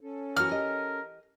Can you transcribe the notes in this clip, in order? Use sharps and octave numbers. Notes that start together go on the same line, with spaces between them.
C#4 A4
E3 F#4 A#4 F6
G4 D#5